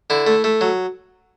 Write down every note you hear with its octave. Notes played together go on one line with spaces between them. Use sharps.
D3 E4
A3
A3
F#3